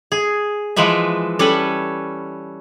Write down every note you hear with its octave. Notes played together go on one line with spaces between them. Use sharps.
G#4
E3 F3 G#3 B4 E5
G3 C#4 A4 B4